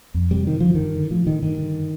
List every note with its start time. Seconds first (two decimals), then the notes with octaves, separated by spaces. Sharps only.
0.14 F2
0.31 C3 G3
0.46 G2 D#3
0.60 D3 F3
0.75 G2 D#3
0.95 D3
1.10 A2 F3
1.26 A2 D#3
1.42 G2 D#3
1.58 D3